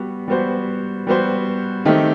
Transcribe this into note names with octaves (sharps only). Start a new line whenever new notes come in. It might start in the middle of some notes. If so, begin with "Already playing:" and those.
Already playing: G3 B3 F#4
G3 B3 F#4 C5
G3 B3 F#4 C5
D#3 A3 C4 D#4 G4